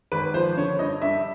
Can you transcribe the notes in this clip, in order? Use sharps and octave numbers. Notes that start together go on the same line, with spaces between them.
G#1 B4
F3 C5
D3 C#5
G2 D#5
G2 E5